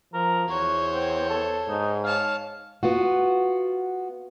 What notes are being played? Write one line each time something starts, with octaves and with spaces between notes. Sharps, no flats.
F3 A#4
E2 F#4 C5 C#5 G#6
C4
A4
G#2 D#4
C#5 F5 A5
B3 F4 F#4